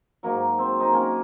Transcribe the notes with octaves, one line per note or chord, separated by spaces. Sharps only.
G#2 D#3 F#3 A#3
C4
D#4
A#3 C#4